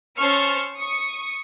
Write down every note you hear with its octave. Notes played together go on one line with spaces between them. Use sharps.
C#4 C5 A5 C#6 E6 F6
C#6 D#6 C#7